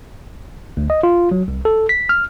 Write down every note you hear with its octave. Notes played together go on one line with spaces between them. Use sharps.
D2
D#5
F4
F#3
C2
A4
B6
F6